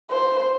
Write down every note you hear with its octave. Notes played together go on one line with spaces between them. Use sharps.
C5